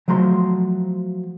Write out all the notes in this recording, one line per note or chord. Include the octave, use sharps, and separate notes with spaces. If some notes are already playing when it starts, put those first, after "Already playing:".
F3 F#3 A3 A#5 C6